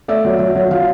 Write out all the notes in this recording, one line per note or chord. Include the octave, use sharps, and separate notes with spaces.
A3 D5 E5
F#3
F#3
F#3
F3 F5